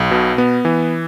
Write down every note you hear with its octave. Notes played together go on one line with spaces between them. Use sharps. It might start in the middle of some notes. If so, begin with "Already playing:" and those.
Already playing: B1
B2
B3
E3